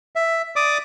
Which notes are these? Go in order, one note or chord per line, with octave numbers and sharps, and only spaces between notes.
E5
D5 D6 D#6